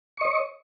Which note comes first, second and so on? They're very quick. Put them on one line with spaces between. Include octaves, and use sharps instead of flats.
C#6 D#5 C#5